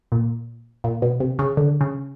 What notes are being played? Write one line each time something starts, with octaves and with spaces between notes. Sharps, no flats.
A#2
A#2
B2
C3
C#3
D3
C#3